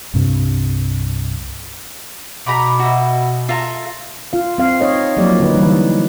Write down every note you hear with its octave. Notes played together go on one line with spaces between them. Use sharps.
C2 G2 C3 G3
B2 A#5 B5 D6
F#4 D#5 E5
F4 A4 E5 A#5
F4 F5
C4 F5
D#4 C#5 D#5
F3 F#3 A#3 G4 D5
D3 D#4 B4
E3 G3